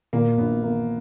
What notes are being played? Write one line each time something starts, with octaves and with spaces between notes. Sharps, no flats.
A#2 A#3
A#1 B3
A#3